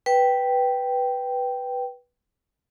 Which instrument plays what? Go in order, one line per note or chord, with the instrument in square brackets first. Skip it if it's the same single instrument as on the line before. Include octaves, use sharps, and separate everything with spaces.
[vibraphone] B4 G5